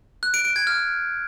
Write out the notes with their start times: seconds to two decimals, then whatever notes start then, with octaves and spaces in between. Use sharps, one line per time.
0.23 F#6
0.34 D7
0.45 D7
0.56 G#6
0.67 F6